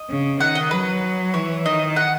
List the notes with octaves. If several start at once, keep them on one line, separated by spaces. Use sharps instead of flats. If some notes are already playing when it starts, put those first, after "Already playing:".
Already playing: D#5
C#3
D#3 F#5
D#5
F#3 B4
E3 C#5
D#3 D#5
F#5